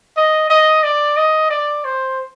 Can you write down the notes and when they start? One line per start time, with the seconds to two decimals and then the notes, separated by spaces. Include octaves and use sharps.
0.17 D#5
0.50 D#5
0.84 D5
1.17 D#5
1.50 D5
1.84 C5